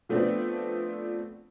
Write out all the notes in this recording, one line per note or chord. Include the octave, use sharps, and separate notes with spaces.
F3 A3 B3 C4 D4